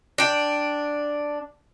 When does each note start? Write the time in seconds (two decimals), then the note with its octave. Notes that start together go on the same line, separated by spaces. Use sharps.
0.18 D4 G5